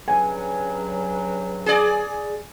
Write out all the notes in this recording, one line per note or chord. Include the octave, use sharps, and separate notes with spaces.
G2 C#3 F#3 G#5
G#4 D5